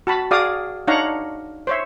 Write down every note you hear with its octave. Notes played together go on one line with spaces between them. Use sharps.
F#4 A5 B5
F#4 G#4 D5 F5 D6 D#6
D4 D#4 C#5 F5 F#5 A#5
C5 C#5 E5